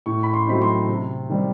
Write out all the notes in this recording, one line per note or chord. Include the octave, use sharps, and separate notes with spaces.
A2 C#6
B5
C6
F#3 A3 C4 D#4 B5
C6
C3
D#3 G3 C4